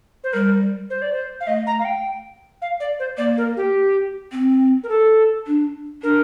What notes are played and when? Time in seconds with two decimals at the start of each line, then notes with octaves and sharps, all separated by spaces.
0.24 C5
0.33 G3 A#4
0.90 C5
1.02 D5
1.13 C5
1.41 F5
1.47 A3 D#5
1.67 A#5
1.80 F5
1.85 G5
2.62 F5
2.80 D5
2.99 C5
3.18 A#3 D5
3.38 A#4
3.57 G4
4.32 C4
4.84 A#4
4.89 A4
5.46 D4
6.03 D4 A#4